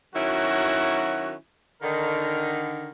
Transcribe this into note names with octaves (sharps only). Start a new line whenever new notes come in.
D#3 F#3 C#4 E4 F#4
D3 D#3 A#4